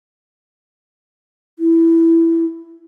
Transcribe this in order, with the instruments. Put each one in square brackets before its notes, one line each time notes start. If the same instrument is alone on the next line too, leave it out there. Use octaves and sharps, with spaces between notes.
[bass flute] E4